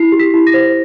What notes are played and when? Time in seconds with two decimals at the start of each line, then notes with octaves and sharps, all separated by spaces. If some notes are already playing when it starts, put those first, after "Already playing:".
Already playing: E4 C7
0.12 G4
0.19 B6
0.34 E4
0.47 A#6
0.54 C5